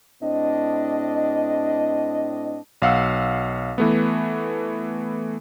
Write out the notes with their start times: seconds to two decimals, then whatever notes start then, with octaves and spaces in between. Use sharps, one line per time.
0.23 A2 C4 D4 D#5
2.82 B1 F5 F#5 E6
3.78 E3 A3 B3